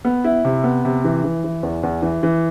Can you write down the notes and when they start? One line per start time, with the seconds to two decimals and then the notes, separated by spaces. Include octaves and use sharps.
0.05 B3
0.24 E4
0.45 C3
0.64 B3
0.85 C3
1.04 E3
1.24 E3
1.44 E3
1.63 E2
1.83 E2
2.02 E3
2.23 E3